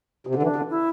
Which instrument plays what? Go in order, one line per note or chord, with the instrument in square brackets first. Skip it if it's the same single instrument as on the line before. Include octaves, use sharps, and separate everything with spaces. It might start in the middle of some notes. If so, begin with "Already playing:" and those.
[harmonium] C3
D3
[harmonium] E3 [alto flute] D4
[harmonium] D3
[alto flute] E4